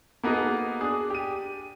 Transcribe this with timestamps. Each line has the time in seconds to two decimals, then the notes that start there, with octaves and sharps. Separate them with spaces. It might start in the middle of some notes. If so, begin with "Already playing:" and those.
0.23 A#3 B3 D#4 F#4 G#4 A4
0.81 D4 G#4 D#6
1.10 G4 D#7